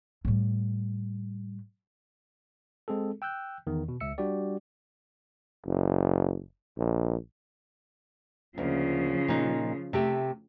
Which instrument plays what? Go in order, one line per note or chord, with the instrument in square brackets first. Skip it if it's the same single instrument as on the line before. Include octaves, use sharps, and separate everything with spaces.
[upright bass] A2 G3
[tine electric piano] G#3 C4 G#4 A4
G5 E6 F#6 G6
E2 D#3
B2
C#2 E5 E6 C#7
G3 D4 F#4 G4 D5
[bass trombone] F#1
A#1
[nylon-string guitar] D2 A#3 [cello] C#3 F3
[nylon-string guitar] A#2 D#4
C3 A3 G4